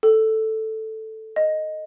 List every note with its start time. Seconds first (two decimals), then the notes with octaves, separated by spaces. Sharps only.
0.03 A4
1.36 D#5